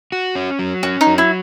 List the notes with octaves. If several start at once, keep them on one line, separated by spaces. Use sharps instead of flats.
F#4
C#4
F#3
C#4 F#4
D#4
F#3
E4